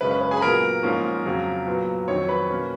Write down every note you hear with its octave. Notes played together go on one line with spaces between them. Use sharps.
F#2 C#3 G#3 C#4 B4
B4
B4
G#4 G#5
B5
A#2 F#3 B3 A#4 A#5
G#2 F3 A#3 C#4
F2 C#3 F#3
A#2 F#3 B3
F2 D#3 F#3 C#5 C#6
B4 B5
B2 A#3 C#4